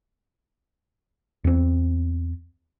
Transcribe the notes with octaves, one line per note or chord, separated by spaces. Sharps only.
E2 C4